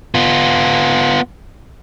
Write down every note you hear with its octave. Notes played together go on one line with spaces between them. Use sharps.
B3 F4